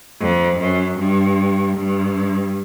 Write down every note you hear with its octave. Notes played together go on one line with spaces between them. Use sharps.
F2
F#2
G2
G2